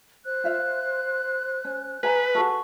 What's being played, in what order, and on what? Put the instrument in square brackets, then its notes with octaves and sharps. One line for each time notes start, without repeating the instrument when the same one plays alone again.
[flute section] C5 F#6
[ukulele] F4 E5 F5
C#4
[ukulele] G#4 G#5 A#5 [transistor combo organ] B4
[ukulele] F#4 G#4 A4 [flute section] C#6